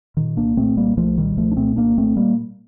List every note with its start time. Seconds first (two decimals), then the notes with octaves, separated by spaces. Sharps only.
0.17 A#2 D#3
0.37 C2 A#3 D4
0.57 A#2 A3 C4
0.76 C2 G3 A#3
0.97 C2 F3 A3
1.17 A#2 D#3 G3
1.37 C2 F3 A3
1.51 D4
1.57 A#2 A3 C4
1.76 C2 A#3 D4
1.97 A#2 A3 C4
2.16 G3 A#3